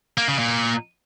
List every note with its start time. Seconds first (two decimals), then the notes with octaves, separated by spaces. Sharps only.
0.18 A#3
0.28 C#3
0.39 A#2